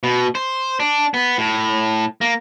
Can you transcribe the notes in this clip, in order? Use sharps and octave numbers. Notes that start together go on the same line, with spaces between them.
B2
C5
D4
B3
A2
A#3